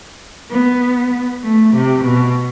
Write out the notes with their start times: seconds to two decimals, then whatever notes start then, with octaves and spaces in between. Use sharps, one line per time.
0.50 B3
1.43 A3
1.74 C3
2.05 B2